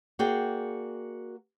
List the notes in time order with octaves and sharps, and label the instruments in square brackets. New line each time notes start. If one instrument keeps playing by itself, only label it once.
[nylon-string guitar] A#3 F#4 G#4 D5 G5